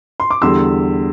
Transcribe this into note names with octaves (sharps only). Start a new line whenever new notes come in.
C6
D6
E2 D3 G3 C6 E6